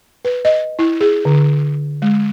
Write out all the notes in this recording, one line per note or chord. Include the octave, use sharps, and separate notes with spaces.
B4
D#5
E4
G#4
D3
G#3